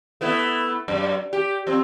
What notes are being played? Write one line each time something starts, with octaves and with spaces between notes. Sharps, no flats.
A3 B3 E4
F#2
G4
F3 C4